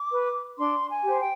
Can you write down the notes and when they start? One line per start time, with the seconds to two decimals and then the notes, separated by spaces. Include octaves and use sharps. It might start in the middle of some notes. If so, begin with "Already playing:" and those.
Already playing: D6
0.12 B4
0.58 D4 C6
0.89 G#5
1.04 G4
1.09 C5
1.20 G5